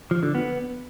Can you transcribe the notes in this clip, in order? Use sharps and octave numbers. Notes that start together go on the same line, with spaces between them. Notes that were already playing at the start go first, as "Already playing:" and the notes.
F3
D3
B3